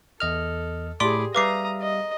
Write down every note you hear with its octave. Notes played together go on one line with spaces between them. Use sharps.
E2 A4 D#5 F6
A2 G4 G#4 D5 B5 C6 D6
G3 B4 E5 F5 A#5 D6 D#6 C7
D#5